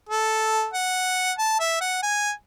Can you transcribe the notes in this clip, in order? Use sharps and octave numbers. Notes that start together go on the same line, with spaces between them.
A4
F#5
A5
E5
F#5
G#5